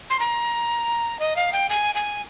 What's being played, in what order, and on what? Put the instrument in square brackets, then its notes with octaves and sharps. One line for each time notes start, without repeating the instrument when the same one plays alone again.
[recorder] C6
A#5
D#5
F5
G5
G#5
G#5